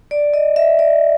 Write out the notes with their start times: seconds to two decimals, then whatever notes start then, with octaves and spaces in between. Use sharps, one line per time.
0.11 D5
0.34 D#5
0.56 E5
0.79 D5